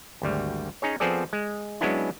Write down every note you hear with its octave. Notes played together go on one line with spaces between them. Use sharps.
G#1 D2 G3
C#4 D#4 G#4 C#5
F3 B3 C4 G#4 A4 D5
G#3
F#3 G#3 B3 C#4 D4 E4